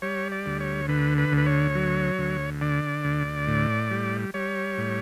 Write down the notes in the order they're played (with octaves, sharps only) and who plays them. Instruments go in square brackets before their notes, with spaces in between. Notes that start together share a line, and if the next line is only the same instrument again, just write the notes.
[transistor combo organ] G3 C#5
D5
D2
C#5
D3 B4
B4
D2
B4
C#5
F#3
D2
D3 D5
D2
A2
G3
G3 C#5
A2